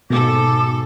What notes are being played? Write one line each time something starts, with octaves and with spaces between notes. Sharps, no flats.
G#2 B2 A4 D6